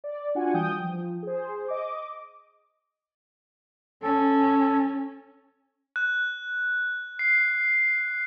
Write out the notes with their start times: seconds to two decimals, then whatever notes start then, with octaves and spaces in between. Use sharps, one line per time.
0.04 D5
0.35 D4 F4 F#4 F#5 G#5
0.54 E3 G3 G5 D#6 G6
0.80 F3
1.23 G#4 C5
1.68 D#5 D6
4.03 C#4 A4
5.96 F#6
7.19 C7